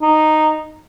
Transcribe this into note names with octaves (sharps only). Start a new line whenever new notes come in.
D#4